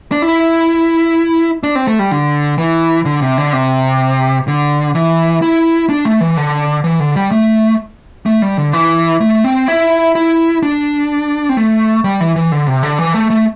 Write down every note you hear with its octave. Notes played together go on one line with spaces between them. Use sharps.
D4
E4
D4
C4
A3
G3
D3
E3
D3
C3
D3
C3
D3
E3
E4
D4
A3
E3
D3
E3
D3
G3
A3
A3
G3
D3
E3
A3
C4
E4
E4
D4
C4
A3
G3
E3
E3
D3
C3
D3
E3
A3
A3